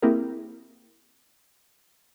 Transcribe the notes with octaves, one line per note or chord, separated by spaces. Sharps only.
A#3 C4 E4 G4 G#4 A#4